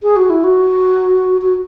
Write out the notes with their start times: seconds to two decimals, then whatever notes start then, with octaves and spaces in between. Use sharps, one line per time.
0.03 G#4
0.16 F#4
0.30 E4
0.44 F#4
1.42 F#4